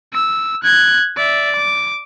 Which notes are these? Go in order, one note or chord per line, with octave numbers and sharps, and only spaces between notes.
E6
F#6 G#6
D5 E5
D6